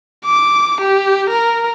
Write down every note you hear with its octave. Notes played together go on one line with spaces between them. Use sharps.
D6
G4
A#4